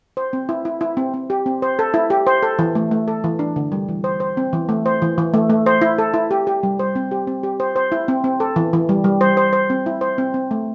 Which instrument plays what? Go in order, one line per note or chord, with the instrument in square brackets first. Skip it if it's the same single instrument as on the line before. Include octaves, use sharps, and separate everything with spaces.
[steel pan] C5
C4
E4
E4
E4
C4
C4
G4
C4
C5
A4
E4
G4
C5
A4
E3
A3
A3
A4
E3
D4
D3
G3
E3
C5
C5
C4
E3
A3
C5
E3
E3
A3
A3
C5
E4
A4
E4
G4
G4
G3
C5
C4
G4
C4
G4
C5
C5
E4
C4
C4
A4
E3
E3
G3
G3
C5
C5
C5
C4
E4
C5
C4
C4
A3